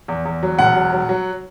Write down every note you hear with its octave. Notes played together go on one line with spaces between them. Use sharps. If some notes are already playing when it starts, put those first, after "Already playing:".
E2
E2
F#3
E1 F#5
F#3
F#3
F#3